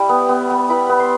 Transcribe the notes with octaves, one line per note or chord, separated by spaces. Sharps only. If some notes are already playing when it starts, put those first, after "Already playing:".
Already playing: G3 E4 G4 G5
B3
B3
B3
E4 B4 B5
B3
C5 C6